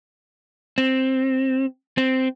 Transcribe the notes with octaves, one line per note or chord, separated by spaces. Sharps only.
C4
C4